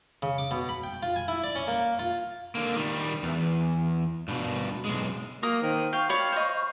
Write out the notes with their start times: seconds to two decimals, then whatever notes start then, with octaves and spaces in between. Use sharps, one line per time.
0.22 C#3
0.38 D6
0.51 B2
0.69 B5
0.83 G5
1.02 F4
1.16 G#5
1.28 E4
1.44 D5
1.55 C#4
1.68 A#3
1.99 F4
2.55 D3 A#3
2.76 D#3 G3
3.23 E2
4.28 G2 B2
4.85 B1 G#3
5.43 A#3 A#4 D#6
5.62 D#3 C5
5.93 F5 G5 C#6
6.09 C#5 D5 B5
6.32 C5 D#5